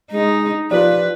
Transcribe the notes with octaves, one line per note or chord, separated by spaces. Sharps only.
G#3 D#4
F3 G4 B4 D5